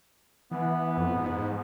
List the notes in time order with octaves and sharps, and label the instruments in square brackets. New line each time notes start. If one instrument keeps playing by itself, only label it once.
[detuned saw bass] E3 [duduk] B3
[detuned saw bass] F2
G#2